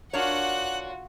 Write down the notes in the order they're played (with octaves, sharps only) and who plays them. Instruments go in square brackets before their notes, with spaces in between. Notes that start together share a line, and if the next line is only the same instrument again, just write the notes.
[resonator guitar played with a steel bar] D4 A#4 C#5 [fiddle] F4 F#4 [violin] F#5 F#6